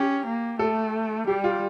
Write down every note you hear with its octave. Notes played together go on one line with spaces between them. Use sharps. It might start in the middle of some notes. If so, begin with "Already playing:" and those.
Already playing: C#4 G4
A#3
A3 A4
G3 G4
F4